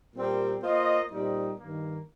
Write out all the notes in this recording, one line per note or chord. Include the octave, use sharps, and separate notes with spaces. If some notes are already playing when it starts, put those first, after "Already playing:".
A#2 G3 C4 G4 A#4
A#3 F4 C5 D#5
A#2 G3 C4 D#4
G2 D#3 A#3